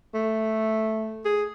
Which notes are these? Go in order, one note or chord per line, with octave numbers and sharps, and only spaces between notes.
A3
G#4